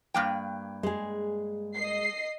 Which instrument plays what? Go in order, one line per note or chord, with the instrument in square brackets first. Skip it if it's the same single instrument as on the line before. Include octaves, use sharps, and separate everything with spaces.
[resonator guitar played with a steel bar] G2 A#3 G5
[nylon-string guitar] G#3 G#4
[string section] D#5 C7